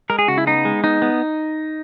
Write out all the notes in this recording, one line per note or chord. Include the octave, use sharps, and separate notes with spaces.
G#3 A#4
G#4
C#3 F#4
E4
B3 D#4
G#3
B3 D#4
B3